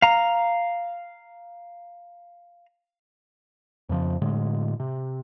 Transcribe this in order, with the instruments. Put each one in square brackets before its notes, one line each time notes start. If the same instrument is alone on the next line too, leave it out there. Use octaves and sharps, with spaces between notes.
[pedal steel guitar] F5 A#5
[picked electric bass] F2 C#3 F3
A2 D3 G#3
C3